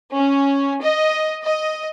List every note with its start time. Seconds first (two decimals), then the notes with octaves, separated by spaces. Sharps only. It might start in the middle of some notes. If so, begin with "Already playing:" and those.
0.14 C#4
0.81 D#5
1.44 D#5